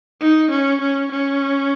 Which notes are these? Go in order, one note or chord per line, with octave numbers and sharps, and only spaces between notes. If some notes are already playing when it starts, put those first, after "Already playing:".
D#4
C#4
C#4
C#4